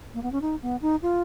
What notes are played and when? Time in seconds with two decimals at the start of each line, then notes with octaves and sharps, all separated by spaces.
0.14 A#3
0.23 B3
0.32 C#4
0.42 D#4
0.62 B3
0.82 D#4
1.02 F4